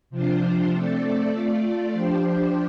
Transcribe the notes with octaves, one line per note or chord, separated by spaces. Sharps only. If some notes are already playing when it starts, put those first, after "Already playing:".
C3 F3 D4 F4 C5
A3 C4 A4 D5
A3 F4 D5
F3 D4 G4 C5